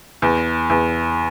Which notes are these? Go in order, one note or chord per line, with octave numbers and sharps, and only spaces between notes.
E2
E2